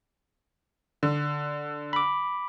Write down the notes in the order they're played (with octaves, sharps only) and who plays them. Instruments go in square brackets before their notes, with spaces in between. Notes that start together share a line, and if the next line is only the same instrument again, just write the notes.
[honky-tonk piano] D3
[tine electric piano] B5 D6